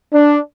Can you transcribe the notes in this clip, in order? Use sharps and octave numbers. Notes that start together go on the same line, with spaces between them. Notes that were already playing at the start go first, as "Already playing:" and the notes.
D4